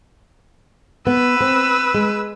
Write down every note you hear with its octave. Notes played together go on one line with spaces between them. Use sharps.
B3 B4 E6
C4
G#3